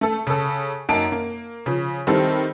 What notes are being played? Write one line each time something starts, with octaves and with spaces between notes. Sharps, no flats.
A3 A4
C#3 A4
F#2 A#3 D#4 A5 D7
A#3
C#3 F3
D#3 G3 C4 E4 A4